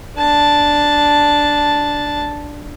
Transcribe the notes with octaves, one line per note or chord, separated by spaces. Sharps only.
D4 A5